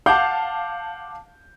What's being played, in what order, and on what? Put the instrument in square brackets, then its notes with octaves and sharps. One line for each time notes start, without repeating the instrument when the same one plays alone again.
[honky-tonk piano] F5 A5 [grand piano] F#5 D6 G6